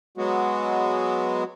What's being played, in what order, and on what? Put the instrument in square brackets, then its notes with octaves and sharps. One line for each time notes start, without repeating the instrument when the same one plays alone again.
[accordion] F#3 G#3 B3 [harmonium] F#4